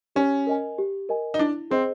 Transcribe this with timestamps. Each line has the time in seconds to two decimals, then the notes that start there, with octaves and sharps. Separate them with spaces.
0.16 C#4 G4
0.47 A#4 D#5 G#5
0.78 G4
1.09 A#4 D#5 G#5
1.34 D#4
1.39 D4 E4
1.71 C4 G#4 C5 D#5